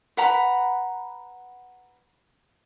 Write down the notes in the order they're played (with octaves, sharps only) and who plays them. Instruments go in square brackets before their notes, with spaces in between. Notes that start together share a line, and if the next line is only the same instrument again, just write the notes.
[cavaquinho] B4 F#5 A#5 B5